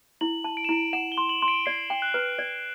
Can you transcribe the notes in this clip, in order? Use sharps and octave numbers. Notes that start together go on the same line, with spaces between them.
E4 F#7
A5
D7
E7
E4 D7
F#5 E7
G7
C6
F#7
C6
D7
D5 C7
G5
F#6
B4
D5